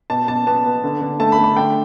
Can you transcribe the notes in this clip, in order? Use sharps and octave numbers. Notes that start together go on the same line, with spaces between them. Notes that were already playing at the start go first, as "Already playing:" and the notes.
B2 A5
B2 A5
B3 A5
B3
D3
D3
A3 A5
B5
A3
B5
D3 G5